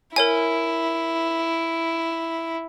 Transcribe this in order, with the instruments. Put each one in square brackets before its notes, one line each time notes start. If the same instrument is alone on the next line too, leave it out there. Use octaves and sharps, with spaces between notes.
[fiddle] E4 [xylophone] A#4 C#5 G#5